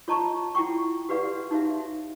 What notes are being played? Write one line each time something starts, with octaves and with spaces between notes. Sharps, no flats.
F4 C#5 D#5 A5 A#5 C#6
E4 F4 F#5 G5 C#6
F#4 G4 B4 D5 F5 F#5
D#4 F#4 C#5 E5 F5